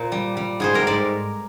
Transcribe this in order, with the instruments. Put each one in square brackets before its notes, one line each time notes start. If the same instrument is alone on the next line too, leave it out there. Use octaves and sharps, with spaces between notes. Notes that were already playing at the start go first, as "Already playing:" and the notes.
Already playing: [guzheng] A#2 A#4 C5
G3
G3
G#2 G#4 C5
G4 A#4
G#2 A#4 D5